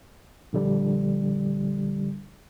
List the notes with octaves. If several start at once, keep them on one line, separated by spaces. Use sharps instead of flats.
A#1 D3 G3